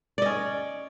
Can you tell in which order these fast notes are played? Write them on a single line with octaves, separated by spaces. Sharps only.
D5 D#5 C#4